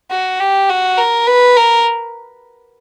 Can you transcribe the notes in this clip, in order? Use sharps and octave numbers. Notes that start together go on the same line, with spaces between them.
F#4
G4
F#4
A#4
B4
A#4